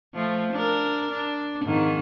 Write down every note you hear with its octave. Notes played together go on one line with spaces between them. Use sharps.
F3 A3
D4 A#4
D4
F2 G#2 D#3